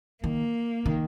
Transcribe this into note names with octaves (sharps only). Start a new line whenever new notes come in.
D#3 A#3
D#3